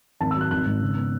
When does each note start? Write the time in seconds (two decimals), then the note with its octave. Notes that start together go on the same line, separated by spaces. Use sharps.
0.20 G#1 A5
0.31 E6
0.36 F#3
0.41 F#6
0.51 G#1 F#6
0.67 G#2
0.81 C#3
0.97 B3